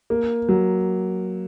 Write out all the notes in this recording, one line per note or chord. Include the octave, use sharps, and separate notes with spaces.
A#3
F#3